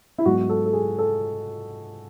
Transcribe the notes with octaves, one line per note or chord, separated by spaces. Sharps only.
E4
G#2 F#3 B3 F#4
A4
A4
G#4
A4